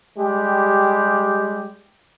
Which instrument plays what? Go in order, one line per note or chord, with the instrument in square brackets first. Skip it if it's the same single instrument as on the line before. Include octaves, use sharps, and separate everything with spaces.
[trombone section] G3 G#3 G4